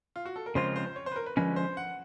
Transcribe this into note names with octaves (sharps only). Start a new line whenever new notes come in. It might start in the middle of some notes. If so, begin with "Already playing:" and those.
F4
F#4
A4
A#4
C#3 F3 G#3 C4 F4 C5
C5
C5
C#5
C5
B4
A#4
B4
D3 F3 G#3 C#4 B4
C5
F#5